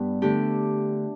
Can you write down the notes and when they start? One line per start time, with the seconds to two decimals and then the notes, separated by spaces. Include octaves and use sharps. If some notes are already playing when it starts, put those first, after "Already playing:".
Already playing: G2 G3 B3
0.22 D3 A3 D4 G4